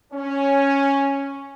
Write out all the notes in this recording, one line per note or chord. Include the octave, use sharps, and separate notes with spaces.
C#4